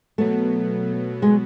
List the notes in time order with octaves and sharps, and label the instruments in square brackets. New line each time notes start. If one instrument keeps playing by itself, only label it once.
[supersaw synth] B2 F#3 B3 [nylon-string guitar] A3
[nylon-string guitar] G#3